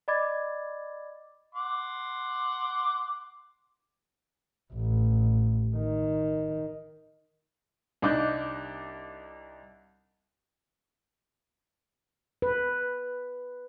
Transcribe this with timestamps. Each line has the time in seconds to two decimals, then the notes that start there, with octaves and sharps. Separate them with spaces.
0.08 D5 D#5 B5 D6 G#6 A6
1.55 F#5 C6 D6
4.74 A1
5.76 D#3
8.02 C2 D4 D#4 D6 F#6 G6
12.42 B4